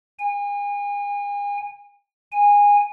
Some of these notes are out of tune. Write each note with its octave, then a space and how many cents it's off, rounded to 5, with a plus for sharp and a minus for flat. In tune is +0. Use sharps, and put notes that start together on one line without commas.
G#5 -35
G#5 -20